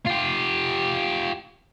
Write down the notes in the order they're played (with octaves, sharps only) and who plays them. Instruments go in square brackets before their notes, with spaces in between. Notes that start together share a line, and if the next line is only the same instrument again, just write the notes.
[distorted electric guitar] F4 G4